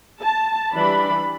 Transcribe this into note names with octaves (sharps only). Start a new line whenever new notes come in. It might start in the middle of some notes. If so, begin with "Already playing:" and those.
A5
E3 G3 D4 B5